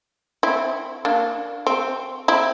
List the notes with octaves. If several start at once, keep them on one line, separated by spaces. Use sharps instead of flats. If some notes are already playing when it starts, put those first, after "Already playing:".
C4 E4
A#3 D4
C4
C4 E4